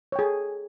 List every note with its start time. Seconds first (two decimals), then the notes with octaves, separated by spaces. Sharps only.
0.12 C#5
0.16 G5
0.19 G#4
0.22 A4